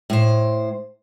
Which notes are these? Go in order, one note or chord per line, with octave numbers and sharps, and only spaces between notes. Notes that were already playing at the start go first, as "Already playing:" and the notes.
A2 C5